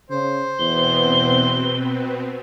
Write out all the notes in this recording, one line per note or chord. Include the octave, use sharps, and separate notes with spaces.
C#3 C5
E2 B2 B3 C4 G7